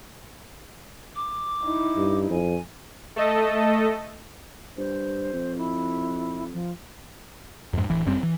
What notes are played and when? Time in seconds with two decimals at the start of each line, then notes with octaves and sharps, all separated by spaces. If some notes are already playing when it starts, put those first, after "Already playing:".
1.15 D6
1.64 D#4 E4
1.97 G2
2.30 F2 G#5
3.16 A3 A4 D#5
4.78 G2 C5
5.33 F2
5.57 E4
6.53 F3
7.73 F2 G#2
7.89 D1 E3
8.05 G1 F#2 G3 C4
8.23 E3